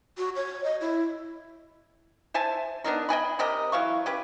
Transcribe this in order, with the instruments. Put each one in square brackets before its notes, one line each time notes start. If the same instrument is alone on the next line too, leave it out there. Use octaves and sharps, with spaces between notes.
[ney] F#4
C#5
D#5
E4
[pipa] C5 E5 G#5 A5
B3 D4 D#4 A#4
D#5 G5 G#5 B5
C3 G4 A#4 D#5
E3 F#3 F5 C#6
C#4 G4 B4